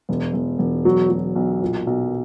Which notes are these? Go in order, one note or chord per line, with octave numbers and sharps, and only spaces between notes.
E1
E1
E1
F#3
F#3
B1
A#2
B1